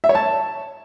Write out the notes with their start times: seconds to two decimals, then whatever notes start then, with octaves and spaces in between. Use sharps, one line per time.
0.04 E5
0.09 C#5
0.15 A5